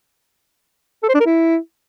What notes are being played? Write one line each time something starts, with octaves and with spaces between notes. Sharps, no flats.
A4
C5
D4
A#4
E4